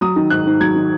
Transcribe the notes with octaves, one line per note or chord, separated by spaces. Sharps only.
F#3 D#6
D#3
G#2 F#6
G#2
F#3 G#6
D#3